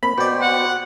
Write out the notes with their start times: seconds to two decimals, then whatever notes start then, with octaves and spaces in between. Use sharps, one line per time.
0.03 A#3 C4 B5
0.18 B2 F#4 C5 D5 G5
0.42 F#5